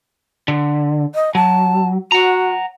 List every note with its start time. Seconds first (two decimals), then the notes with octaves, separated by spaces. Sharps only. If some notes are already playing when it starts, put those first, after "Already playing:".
0.48 D3
1.15 D#5
1.35 F#3 A5
2.12 F#4 F#5 A#5